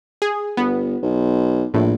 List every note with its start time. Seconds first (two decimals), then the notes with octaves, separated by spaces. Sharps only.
0.22 G#4
0.57 G1 B3
1.03 B1
1.74 A#1 A2